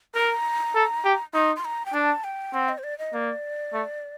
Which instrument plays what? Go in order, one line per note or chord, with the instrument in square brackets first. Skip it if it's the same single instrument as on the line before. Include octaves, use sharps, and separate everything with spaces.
[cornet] A#4 [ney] A#5
[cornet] A4
G4
[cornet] D#4 [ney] C6
[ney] C6
A#5
G5
[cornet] D4 [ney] A5
[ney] G5
[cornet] C4 [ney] F#5
[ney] D#5
C5
D5
D#5
[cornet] A#3 [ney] D5
[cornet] A3